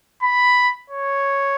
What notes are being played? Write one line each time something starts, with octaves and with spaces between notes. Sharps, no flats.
B5
C#5